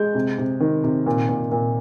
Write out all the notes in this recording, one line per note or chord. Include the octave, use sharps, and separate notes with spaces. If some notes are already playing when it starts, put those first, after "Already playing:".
Already playing: G#3 G6
C3
C3
D#3
C3
A#2
A#2
A#2